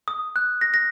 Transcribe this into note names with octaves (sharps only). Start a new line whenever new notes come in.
D#6
F#6
A#6
A#6